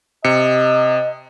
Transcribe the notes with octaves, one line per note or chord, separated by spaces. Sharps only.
C3 D#5 C#7